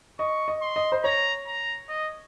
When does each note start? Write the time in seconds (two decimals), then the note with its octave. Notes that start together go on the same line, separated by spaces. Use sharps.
0.19 D#5 C#6
0.48 D#5
0.61 C6
0.76 D#5
0.92 C5
1.04 C#5 A#5
1.47 A#5
1.89 D#5